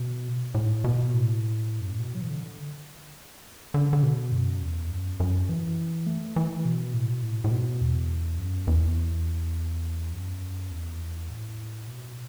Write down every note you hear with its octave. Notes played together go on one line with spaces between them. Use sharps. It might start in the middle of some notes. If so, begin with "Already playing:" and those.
Already playing: B2
A2
B2
A2
F#2
A2
B2
F#3
E3
D3
D3
D3
B2
F#2
E2
F#2
F#2
E3
A3
E3
B2
A2
B2
A2
A2
B2
E2
F#2
E2
F#2
E2
A2
B2